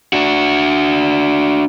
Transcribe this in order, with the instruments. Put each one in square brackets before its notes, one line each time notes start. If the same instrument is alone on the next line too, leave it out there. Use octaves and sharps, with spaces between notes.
[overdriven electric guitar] D4 F#4